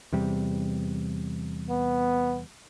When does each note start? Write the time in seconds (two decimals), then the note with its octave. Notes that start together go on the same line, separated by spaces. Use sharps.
0.13 E2 C3 G3
1.70 B3